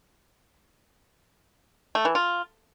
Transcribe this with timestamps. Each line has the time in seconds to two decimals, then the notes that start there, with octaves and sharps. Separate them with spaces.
1.95 A3
2.05 E3
2.15 F4